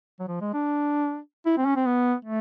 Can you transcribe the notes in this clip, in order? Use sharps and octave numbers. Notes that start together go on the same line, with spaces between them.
F#3
F3
G#3
D4
E4
C4
C#4
C4
B3
A3